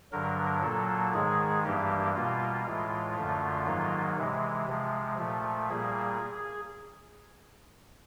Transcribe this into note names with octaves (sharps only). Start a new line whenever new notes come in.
G2 D3 F#3 A#4
A#2 F#3 A#3 A4
G#2 D#3 G#3 G#4
G2 E3 G3 A#3 G4
B2 G3 A#3 F4
A2 E3 G#3 F4
F#2 D3 F3 A3
G#2 D#3 F#3 A#3
C3 E3 G#3
C3 F3 G#3
A#2 F3 A3
A#2 G3 A#3 G#4